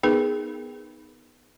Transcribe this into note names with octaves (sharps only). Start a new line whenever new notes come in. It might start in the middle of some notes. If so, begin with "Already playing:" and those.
B3 D#4 G#4 A#4 B4